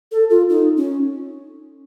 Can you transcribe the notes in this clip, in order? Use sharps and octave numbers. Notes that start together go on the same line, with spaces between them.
A4
F4
D#4
C#4